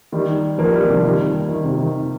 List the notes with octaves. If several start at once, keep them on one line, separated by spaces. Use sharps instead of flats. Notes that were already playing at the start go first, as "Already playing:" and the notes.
D#3 G3
F3 A#3
D#3 G3
C3 F3
D#3 G3
D#3
C3
D#3